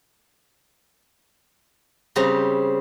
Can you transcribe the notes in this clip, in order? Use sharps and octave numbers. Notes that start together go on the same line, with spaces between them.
C#3 G3 C4 A#5